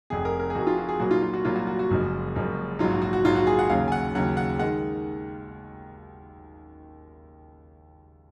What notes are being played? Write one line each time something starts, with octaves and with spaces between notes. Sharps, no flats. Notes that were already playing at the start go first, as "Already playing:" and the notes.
F1 F2 C3 G#4
A#4
A#4
G#4
F1 F2 C3 F#4
F4
F#4
G#4
C2 A#2 F#3 F#4
F4
F4
F#4
C2 A#2 F#3 F4
F#4
F#4
F#4
F#1 F#2 F3 G#3
F#1 F#2 F3 G#3
A#1 G#2 F#3 F4
F#4
F#4
F#4
A#1 G#2 F#3 F4
F#4
G#4
F#5
D#2 C#3 F#3 F5
G#5
F#5
D#2 C#3 F#3 F#5
F#5
D#3 G#3 F#5